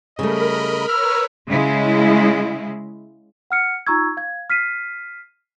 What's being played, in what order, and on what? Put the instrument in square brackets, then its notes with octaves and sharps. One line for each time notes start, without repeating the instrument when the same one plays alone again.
[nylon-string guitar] C#3 G3 A3 [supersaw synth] A#4 B5 [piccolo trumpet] D#5
[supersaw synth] A#4 B4 C#5 [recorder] E6 [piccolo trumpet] F6
[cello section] C#3 G#3 E4
[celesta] F#5 F6 C#7
D#4 F4 A#5 C#6 E6 G#6
F5 G#6
F6 B6 C7 D#7